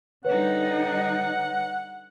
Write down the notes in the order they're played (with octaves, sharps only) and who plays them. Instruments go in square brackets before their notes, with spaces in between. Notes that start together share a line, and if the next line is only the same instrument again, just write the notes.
[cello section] D3 G3 D#4 [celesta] B4 C#5 [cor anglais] F#5